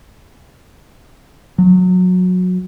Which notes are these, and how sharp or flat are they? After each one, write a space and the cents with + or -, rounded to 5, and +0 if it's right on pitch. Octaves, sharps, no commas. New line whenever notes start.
F#3 -20